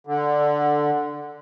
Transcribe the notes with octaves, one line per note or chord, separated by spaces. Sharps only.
D3